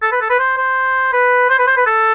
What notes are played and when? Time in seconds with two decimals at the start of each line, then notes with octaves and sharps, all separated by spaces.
0.02 A4
0.12 B4
0.21 A4
0.30 B4
0.39 C5
0.58 C5
1.13 B4
1.50 C5
1.59 B4
1.67 C5
1.77 B4
1.86 A4